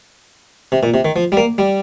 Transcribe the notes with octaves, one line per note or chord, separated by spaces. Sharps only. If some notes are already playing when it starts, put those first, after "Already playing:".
C3
A#2
C3
D#3
F3
G3
A#3
G3